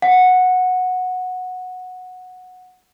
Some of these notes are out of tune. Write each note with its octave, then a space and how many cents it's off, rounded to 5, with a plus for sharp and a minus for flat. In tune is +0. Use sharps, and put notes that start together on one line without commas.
F#5 -10